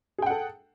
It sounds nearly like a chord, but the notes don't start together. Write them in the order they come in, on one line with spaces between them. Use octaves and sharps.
G#4 G5 F#5 A4